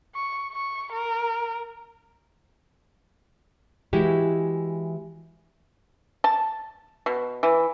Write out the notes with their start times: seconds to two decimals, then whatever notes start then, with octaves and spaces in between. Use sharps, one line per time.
0.15 C#6
0.53 C#6
0.92 A#4
3.93 E3 G#3 E4 F#4 G4
6.24 A5
7.06 B2
7.43 E3